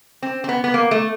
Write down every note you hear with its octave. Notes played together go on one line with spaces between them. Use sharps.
C4
C4
B3
B3
A#3
A3